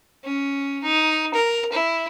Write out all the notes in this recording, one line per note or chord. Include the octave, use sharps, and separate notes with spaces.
C#4
D#4
A#4
E4